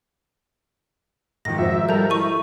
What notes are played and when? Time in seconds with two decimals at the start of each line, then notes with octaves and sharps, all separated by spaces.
1.45 G#2 D#3 F3 A#6
1.58 F#4 C5 E5
1.89 G3 A4 A#4 A#5 G6
2.10 E4 C#6 D#7